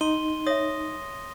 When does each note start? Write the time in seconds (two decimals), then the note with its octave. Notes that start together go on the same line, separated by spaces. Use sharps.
0.01 D#4 C6 D#7 G7
0.47 C#5 E5 D#6 A#6